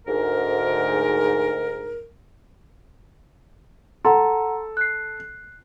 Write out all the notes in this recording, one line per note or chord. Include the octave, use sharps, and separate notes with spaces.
D2 G#2 A#4
A4 F#5 A#5 C6
F#6 C7